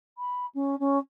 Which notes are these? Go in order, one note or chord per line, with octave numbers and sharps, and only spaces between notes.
B5
C#4
C#4